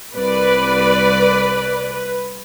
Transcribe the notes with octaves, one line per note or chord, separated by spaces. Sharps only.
C2 B4 D5